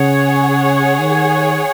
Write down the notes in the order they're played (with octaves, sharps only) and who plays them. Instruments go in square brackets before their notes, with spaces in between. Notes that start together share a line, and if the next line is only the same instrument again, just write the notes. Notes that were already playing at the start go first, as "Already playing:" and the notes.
Already playing: [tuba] C#3 [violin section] G#4 C#5 F#5
[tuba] D#3